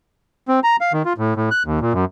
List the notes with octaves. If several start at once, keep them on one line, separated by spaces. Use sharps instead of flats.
C4
A#5
F5
D#3
F4
A2
A2
F#6
D#2
A#2
F#2